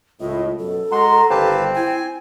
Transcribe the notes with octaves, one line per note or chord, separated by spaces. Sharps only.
C#2 A2 F4 D#5
F#2 B2 A4
G#3 F#4 A#5 C6
G1 D#3 C4 G4 B4 F5 A5
E4 G5 G#5